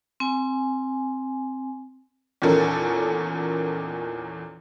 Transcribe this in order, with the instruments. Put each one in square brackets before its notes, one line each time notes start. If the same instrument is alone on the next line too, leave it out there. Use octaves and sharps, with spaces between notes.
[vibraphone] C4 G#5
[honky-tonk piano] E2 A#2 D#3 C#4 A4 A#4